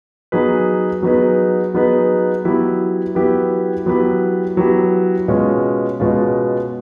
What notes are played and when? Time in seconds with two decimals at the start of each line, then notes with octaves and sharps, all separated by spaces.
0.32 F#3 B3 D#4 G#4 B4
1.03 F#3 B3 D#4 G#4 B4
1.74 F#3 B3 D#4 G#4 B4
2.45 F#3 B3 E4 G4 B4
3.15 F#3 B3 E4 G4 B4
3.86 F#3 B3 E4 G4 B4
4.57 F#3 B3 E4 G4 B4
5.28 B2 G#3 C#4 F4
6.00 B2 G#3 C#4 F4